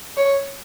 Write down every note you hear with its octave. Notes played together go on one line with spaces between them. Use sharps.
C#5